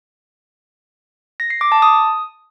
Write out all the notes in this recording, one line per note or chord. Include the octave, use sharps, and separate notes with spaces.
A#6
C7
D6
A5
D#6